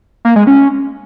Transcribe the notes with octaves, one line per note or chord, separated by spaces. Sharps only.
A#3
G#3
C#4